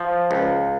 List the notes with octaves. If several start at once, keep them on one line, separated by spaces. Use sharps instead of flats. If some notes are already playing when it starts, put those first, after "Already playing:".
Already playing: F3
C#2